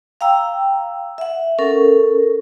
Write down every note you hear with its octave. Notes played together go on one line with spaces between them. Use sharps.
F5 G5 A#5 E6
E5 F#5
C#4 A4 A#4